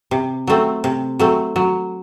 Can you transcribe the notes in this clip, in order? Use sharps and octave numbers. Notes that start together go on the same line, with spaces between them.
C3
F#3 A3 C4
C3
F#3 A3 C4
F#3